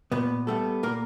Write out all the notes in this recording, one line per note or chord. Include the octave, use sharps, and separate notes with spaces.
A#2 B3 B4
G3 A3 B3 A4
A#2 A#3 A#4